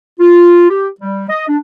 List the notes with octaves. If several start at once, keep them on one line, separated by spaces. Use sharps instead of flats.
F4
G4
G3
D#5
D4